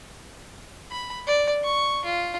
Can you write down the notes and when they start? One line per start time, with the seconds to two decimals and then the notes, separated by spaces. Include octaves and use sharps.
0.91 B5
1.27 D5
1.64 C#6
2.05 F4